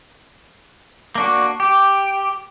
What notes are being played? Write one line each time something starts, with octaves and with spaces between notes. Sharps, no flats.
A#3 D4 F#4
G4